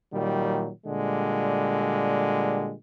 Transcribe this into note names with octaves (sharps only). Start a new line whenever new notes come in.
A#2 D#3 F#3 G3
A#2 D3 G3 G#3